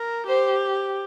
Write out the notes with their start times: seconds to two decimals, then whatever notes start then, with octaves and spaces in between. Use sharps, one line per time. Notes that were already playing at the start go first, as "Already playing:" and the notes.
Already playing: A#4
0.27 G4 C5